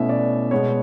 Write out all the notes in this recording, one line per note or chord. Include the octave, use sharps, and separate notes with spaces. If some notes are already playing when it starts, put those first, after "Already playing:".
Already playing: B2 A3 C#4 E4 E5
D5
B2 G#3 B3 C#5